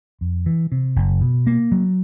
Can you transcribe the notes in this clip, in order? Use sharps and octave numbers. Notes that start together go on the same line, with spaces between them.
F2
E3
C3
F#1
B2
A#3
F#3